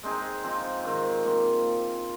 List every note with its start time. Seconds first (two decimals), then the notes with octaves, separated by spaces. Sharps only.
0.03 G#3 C4 D#4 G#4
0.43 F3 C4 D#4
0.84 G#2 D#3 C4
1.24 F3 A#3 F4